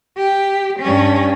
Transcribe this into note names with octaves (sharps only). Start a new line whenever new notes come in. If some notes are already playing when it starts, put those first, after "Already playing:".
G4
G2 C#4